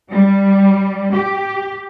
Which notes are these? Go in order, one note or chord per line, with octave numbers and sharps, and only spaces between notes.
G3
G4